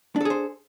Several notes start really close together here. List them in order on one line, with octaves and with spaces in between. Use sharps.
D4 A4 G#4 C5